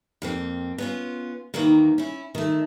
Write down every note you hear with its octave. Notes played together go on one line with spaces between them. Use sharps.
F2 A#3 C4
B3 C#4 F4
D#2 D#3 E3 F#3 A#3
C#4 E4
D#3 A3